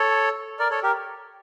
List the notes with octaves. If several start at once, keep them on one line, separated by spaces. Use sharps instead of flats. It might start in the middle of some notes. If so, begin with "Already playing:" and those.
Already playing: A4 C#5
A#4 D5
A4 C#5
G4 A#4